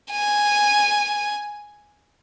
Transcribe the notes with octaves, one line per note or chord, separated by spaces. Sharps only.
G#5